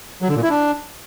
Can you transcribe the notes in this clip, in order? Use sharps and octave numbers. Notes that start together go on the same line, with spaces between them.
F#3
D3
A#2
E4
D4